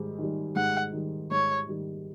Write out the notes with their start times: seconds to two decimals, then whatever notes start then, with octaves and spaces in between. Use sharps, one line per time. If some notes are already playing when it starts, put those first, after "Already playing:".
Already playing: G#2 D#3 G3
0.19 D#3 G3
0.56 G#2 F#5
0.93 D#3 G3
1.31 G#2 C#5
1.68 D#3 G3